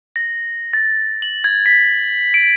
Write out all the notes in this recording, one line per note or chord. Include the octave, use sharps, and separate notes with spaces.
A#6
A6
F#7
G#6
B6
D7